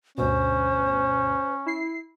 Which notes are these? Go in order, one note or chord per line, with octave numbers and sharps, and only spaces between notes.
D2 G2 B2 C#4 C5
E4 C7